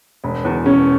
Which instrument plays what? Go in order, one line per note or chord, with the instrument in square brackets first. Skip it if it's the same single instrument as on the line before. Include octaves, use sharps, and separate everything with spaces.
[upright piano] E1
E2 B2
[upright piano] E1 [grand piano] C#4